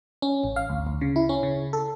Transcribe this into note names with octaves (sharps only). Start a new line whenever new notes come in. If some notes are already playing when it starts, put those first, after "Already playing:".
C#4
A1
F5
D2
D2
C#3
E4
C#4
C#3
A4